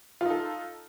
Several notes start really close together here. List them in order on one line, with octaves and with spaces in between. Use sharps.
F4 D#4 A4